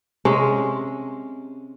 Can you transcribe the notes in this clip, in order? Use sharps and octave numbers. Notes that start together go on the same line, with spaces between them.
C3 G#3 C#4